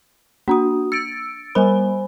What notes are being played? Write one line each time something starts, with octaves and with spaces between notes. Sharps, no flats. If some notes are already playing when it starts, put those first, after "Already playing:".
A#3 D4 F#4 D#6
E6 A6 C#7 D7
G3 A#4 C5 G#5 B5